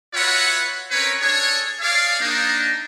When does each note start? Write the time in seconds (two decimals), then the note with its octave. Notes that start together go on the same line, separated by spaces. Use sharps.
0.14 F4 F#4 B4 C#5 E5 F#5
0.91 C4 C#4 A#4 B4 C#5
1.21 D4 G#4 A4 C#5
1.81 G#4 C#5 D5 F5
2.21 A#3 D4 D#4